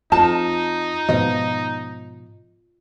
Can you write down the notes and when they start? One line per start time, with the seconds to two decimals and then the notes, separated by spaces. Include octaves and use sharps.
0.12 F2 D#4 F4 A5
1.09 G#2 B2 F3 D#5